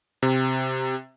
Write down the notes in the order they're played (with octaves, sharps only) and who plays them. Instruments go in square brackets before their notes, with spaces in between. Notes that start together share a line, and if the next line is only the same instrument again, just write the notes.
[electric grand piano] C3